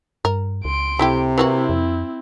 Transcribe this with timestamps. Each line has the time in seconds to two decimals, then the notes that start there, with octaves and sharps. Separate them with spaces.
0.25 G2 A#4
0.65 C#2 C6 D7
0.99 C3 A3 E4 G4
1.38 E3 A#3 C4 E4 F#4
1.69 F2